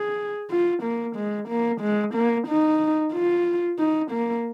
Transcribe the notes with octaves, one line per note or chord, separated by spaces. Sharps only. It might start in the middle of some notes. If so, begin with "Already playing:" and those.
Already playing: G#4
F4
A#3
G#3
A#3
G#3
A#3
D#4
F4
D#4
A#3